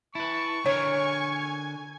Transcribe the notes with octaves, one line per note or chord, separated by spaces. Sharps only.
E4 B4 A5 C#6
D3 A#4 C#5 G#5 G#6